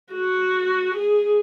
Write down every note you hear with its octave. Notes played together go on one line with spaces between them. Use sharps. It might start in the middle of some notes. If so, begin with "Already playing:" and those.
F#4
G#4